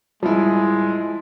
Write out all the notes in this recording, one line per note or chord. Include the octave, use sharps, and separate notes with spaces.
D1 F3 G3 G#3 E4